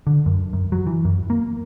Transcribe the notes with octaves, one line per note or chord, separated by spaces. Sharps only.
D3
F#2
F#2
F#3
E3
F#2
A#3